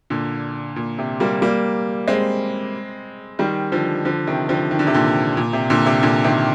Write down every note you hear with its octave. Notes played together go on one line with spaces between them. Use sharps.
A#2 D3
A#2
C3
G3 A#3
G3 A#3
G#3 C4
D#3 G3
D3 F3
D3 F3
C3 D#3
D3 F3
D#3
D3
C3
A#2 D3
A#2
C3
A#2 D3
C3
A#2 D3
C3 D#3